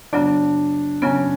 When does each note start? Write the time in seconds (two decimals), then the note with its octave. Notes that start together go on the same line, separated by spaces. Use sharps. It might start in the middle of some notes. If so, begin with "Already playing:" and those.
0.13 F#2 C#3 F#3 B3 D4
1.02 F#2 C#3 F#3 B3 C#4